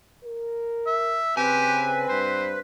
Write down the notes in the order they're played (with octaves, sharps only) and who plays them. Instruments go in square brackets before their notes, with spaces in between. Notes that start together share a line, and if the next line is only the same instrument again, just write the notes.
[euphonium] A#4
[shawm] E5
[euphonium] C#3 [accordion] C4 B4 [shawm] G4 [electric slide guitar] G#5
[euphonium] G2 [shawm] C5